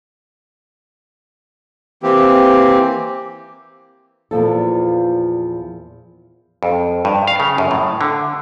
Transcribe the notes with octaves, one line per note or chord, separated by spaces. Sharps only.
E3 A#3 C4 G4
E2 A#2 F3 A4
F2
G2
F5
C#3
F#2
A2
D3